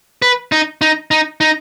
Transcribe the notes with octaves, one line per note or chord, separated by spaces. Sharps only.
B4
D#4
D#4
D#4
D#4